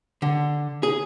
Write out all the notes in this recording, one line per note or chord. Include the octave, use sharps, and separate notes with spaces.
D3
G#4